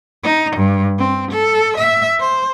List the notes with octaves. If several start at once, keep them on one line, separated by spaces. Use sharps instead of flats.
D#4
G2
C4
A4
E5
C5